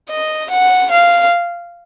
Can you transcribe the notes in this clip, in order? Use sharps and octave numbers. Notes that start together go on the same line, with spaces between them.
D#5
F#5
F5